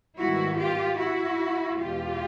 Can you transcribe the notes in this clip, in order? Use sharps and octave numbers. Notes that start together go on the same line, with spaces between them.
G#2 D#3 G3 B3 E4 F#4
F4 G4
E4 F#4
E2 B2 G#3 F4 G4